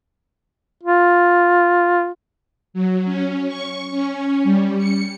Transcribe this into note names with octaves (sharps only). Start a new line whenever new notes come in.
F4
F#3
C#4
C#6
C#4
G3
C#7